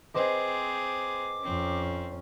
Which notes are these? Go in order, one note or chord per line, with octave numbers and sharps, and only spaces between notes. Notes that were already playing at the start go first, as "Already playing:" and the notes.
C4 G#4 B4 C5 D#5 D6
F2 C4 C#4